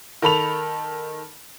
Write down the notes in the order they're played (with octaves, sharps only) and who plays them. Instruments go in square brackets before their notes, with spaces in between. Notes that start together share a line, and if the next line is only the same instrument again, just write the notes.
[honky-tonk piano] D#3 A4 B5 F7